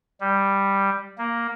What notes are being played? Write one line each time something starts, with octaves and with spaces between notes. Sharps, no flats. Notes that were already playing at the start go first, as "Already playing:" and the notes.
G3
A#3